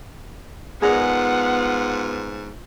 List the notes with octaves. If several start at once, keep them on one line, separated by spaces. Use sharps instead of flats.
G#2 B3 F4 G#4 A#4 D5 F#5